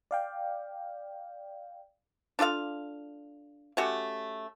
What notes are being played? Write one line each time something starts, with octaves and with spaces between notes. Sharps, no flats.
D5 F5 G5
D4 F4 A4 F5
A3 C#4 F#4 G4